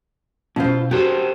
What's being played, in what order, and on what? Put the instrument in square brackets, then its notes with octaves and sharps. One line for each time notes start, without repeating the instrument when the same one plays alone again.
[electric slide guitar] B2 [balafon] C#4 [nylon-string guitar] E4 F4 C5
[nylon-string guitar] F#4 [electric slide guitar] G4 A4 C5